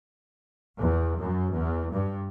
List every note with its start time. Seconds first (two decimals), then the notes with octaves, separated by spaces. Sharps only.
0.78 E2
1.18 F#2
1.53 E2
1.90 G2